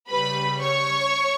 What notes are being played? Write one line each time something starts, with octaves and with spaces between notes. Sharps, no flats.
C#3 G3 B4 B5
C#5 C#6